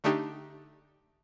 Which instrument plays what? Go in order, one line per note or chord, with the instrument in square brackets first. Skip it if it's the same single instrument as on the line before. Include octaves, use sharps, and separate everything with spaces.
[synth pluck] D3 A3 D4 D#4 G4